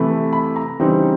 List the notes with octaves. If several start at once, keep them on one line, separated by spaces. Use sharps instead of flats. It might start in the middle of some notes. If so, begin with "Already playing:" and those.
Already playing: C3 E3 A3 B5
B5
A#5
C#3 E3 G3 C4 D#4